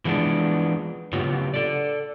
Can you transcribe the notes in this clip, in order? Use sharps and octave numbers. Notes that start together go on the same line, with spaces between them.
E3 F3 G#3 B3 D4
A2 C#3 F#3 B3 F4 G4
A4 D5